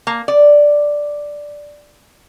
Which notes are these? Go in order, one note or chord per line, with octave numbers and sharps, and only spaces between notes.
A#3
D5